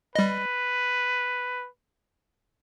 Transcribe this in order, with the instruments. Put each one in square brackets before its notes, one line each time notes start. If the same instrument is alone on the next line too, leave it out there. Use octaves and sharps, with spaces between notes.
[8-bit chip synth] G3 D#5 [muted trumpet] B4